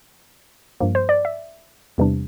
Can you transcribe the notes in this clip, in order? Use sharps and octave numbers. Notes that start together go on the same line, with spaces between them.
G2 F3 A#3
C5
D5
E5
E2 C3 E3 G3 D4